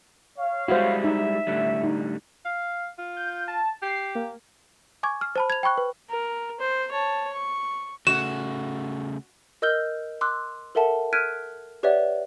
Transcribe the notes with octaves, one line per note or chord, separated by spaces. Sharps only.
C#5 F5
G3 G#3 E4 F#4 C5
D#4 E5
A2 D3 G3
D#4
F5
F4
G6
A5
G4 C7
A#3
G#5 C#6 D6 G#6
F6
C5 A5 B5
G#6 F7
G5 B5 C#6 F#6
B4
A#4
C5
C#5 A5
C#6
C#3 A3 F#4 E7
A#4 D#5 E6 F6 G6 G7
C6 D6 E6 F#6
A4 A#4 E5 F#5 A5
F6 F#6 G#6 B6 D7 D#7
G4 B4 C#5 D5 E5 F#5